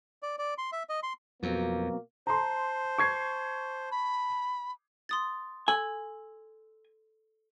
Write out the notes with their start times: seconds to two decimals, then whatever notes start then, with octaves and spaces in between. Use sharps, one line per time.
0.23 D5
0.39 D5
0.58 C6
0.72 E5
0.89 D#5
1.03 C6
1.43 F2 B2 F#3 A#3 C4
2.27 C5 A5 A#5 C6
2.98 C#6 G#6 C7
3.91 B5
5.09 C6 D#6 A6
5.68 A4 G#5 E6